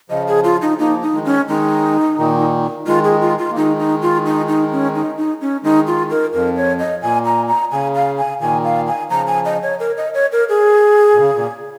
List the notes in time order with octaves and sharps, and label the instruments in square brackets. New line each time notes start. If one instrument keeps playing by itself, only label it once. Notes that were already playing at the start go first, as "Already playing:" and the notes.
[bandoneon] C#3 F3 [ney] D#5
[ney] G#4
F4
D#4
[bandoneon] F3 A#3 [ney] D#4
[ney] D#4
[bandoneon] D#3 G#3
[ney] C#4
[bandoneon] D#3 G#3 [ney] D#4
[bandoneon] A#2 D#3
[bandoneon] D#3 G#3 [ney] F4
[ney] G#4
F4
F4
[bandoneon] A#3
[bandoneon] D#3 G#3 [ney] D#4
[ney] D#4
F4
D#4
D#4
C#4
D#4
D#4
C#4
[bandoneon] D#3 G#3 [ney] D#4
[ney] F4
A#4
[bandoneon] F2 [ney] A#4
[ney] C#5
D#5
[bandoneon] A#2 [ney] G#5
[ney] A#5
A#5
[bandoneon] C#3 [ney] G#5
[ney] F5
G#5
[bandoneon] A#2 D#3 [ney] G#5
[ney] F5
G#5
[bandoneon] C#3 F3 [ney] A#5
[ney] G#5
D#5
C#5
A#4
D#5
C#5
A#4
G#4
[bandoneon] A#2
C#3
A#2